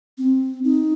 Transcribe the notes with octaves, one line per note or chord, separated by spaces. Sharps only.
C4
D#4